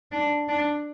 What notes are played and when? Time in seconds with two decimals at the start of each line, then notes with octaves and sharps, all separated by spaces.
0.12 D4
0.49 D4